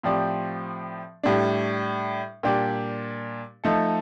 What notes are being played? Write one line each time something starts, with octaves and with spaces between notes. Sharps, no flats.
A2 F3 C4 G4 D5
A2 G3 D4
A#2 G3 D4 G4 D5
F3 A3 D#4 A4